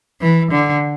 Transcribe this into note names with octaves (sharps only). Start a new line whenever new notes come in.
E3
D3